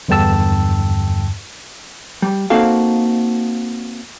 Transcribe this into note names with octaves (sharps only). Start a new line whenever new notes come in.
E2 G2 D3 G5 A5 E6
G3
A#3 C4 D#4 F#4 A4 F5